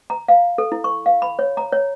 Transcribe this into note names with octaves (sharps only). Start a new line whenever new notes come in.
A#5
F5
A4
E4
C#6
F5
B5
C#5
A#5
C#5